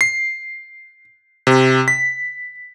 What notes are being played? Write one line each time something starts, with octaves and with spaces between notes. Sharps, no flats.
C7
C3
B6